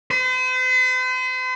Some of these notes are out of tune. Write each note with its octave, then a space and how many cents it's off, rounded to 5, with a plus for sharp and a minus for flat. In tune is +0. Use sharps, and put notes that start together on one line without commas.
C5 -45